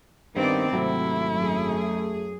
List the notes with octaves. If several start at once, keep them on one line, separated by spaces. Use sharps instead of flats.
G2 D#3 B3 C4 D5
G#1 C3 F#3 A3 E4
F#2 G#4